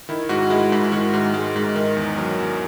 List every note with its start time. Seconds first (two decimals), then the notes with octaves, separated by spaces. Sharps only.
0.09 D#3 E4
0.29 G#2 F#4
0.50 G#3 E4
0.72 G#2 E4
0.84 E4
0.92 D#3 F#4
1.14 G#2
1.34 G#3
1.56 G#2
1.76 D#3
1.97 E2
2.18 F#3
2.39 E2